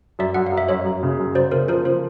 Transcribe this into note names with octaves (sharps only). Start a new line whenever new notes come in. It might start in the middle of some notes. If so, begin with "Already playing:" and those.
F#2 D5 E5
F#2 F#5
F5
F#2
E5
F#2 C#5 D#5
F#2
C#3
F#2
F#2 C5 D5
C#3 A#4 C5
F3 A#4 C5
F3 A#4 C5